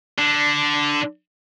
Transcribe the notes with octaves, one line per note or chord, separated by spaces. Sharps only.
D3